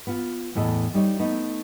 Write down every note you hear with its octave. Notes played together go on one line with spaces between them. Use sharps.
B3 F4
E2 A2 A4 D#5
G3 D#4 C#5
A3 B3 D#4